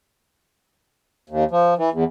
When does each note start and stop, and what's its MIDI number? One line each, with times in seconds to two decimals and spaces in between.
1.30 1.44 39
1.51 1.74 53
1.78 1.90 52
1.93 2.04 40